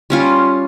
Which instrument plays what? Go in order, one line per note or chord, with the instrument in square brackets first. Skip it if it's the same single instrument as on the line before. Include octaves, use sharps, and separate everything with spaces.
[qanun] G3 C#4 F4